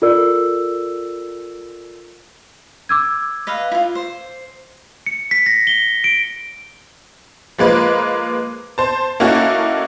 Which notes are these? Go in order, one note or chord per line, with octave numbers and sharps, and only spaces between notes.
F4 A4 A#4 D5 E6
D6 E6 G#6
B4 D#5 F5
E4 F4
C5
C#7
B6
A#6
G7
D7
F3 G#3 A#3 B4
C5 A5
A#3 C#4 D#4 E4 F#4 A4